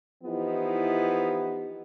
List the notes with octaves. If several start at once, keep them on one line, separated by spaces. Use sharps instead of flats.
E3 F3 B3 D#4 E4 G4